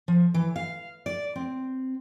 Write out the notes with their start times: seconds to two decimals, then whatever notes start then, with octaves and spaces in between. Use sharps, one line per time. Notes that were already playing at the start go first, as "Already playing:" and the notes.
0.08 F3
0.34 E3
0.56 F5
1.06 D5
1.36 C4